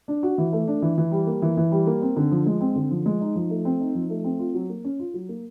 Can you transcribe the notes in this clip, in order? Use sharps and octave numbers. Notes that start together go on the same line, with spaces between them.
D4
F#4
E3
A3
D4
E3
E3
G3
A#3
E3
E3
G3
A#3
C4
D3
F3
G#3
C4
D3
F3
G#3
D#4
F3
A3
C4
D#4
F3
A3
C4
F4
F#3
A#3
C#4
F4
F#3
A#3